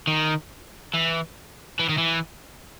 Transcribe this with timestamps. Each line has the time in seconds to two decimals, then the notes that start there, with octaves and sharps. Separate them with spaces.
0.07 D#3
0.94 E3
1.79 E3
1.89 D#3
1.98 E3